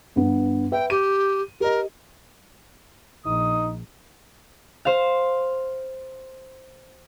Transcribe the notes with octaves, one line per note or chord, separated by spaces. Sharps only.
G2 B3
B4 E5 G5
G4 D#7
G4 A#4 D#5
A#1 D#4 D#6
C5 F5